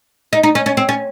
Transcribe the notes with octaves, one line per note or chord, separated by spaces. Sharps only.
D#4
D#4
C#4
C#4
C4
C#4